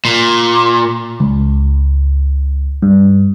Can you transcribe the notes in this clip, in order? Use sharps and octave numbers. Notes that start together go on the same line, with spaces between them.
A#2
C#2
G2